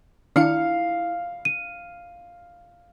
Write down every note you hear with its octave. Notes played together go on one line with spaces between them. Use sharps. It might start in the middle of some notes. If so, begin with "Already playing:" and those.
D#3 D4 E4 F5 C#7
D#7